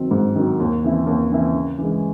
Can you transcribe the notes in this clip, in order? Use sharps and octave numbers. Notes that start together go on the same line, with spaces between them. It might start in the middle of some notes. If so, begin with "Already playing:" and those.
Already playing: D#3 F#3 C4
G#2
D#3 F#3 C4
D#2
C#3 E3 C4 E4
D#2
C#3 E3 C4 E4
C#3
E3 G#3